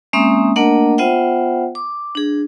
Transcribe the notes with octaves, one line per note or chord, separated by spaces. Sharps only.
G#3 A#3 C4 C#4 E5 D#6
A3 A#3 D4 A#4 D#5 F#5
B3 F4 C5 E5 F#5 G5
D6
D4 G#4